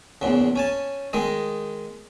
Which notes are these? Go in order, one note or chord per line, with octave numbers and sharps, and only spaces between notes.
A#1 E2 C#3
C#4 G#5 A5
D#3 G#3 D#5